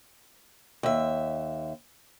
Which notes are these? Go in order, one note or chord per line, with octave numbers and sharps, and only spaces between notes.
D#2 E5